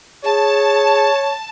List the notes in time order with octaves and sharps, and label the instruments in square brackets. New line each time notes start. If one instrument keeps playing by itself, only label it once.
[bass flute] G#4 [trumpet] C#5 [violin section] A5